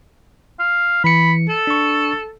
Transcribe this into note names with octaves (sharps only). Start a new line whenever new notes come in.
F5
E3 B5 C#7
A4
D4 C#6